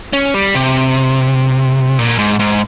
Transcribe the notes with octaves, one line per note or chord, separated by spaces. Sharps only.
C#4
G3
C3
A#2
G#2
G#2